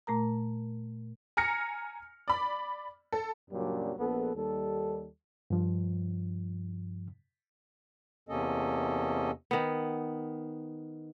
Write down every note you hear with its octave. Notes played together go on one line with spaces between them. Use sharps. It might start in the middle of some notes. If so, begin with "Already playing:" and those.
A#2 A3 A#4 A#5
G#5 A#5 F6 A#6 C#7
D5 B5
A4
F#2 A#2 C#3 F#3 G3 D4
A#1 B3 A4
D#2 G3 A4
G2 F3
E2 C3 A#3 C#4 A4 D#5
D#3 B3